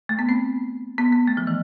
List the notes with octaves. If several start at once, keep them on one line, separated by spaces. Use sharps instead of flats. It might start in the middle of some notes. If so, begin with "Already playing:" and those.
A3
B3
C4
B3
B3
A3
F3
E3